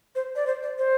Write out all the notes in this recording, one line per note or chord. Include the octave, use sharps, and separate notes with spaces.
C5
D5
C5
D5
C5